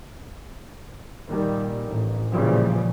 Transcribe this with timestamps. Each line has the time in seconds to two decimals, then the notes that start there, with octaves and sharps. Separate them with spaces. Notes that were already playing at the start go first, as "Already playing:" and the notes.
1.28 A#2 D#3 G3
1.88 A1
2.33 A#2 C#3 E3 F3 G3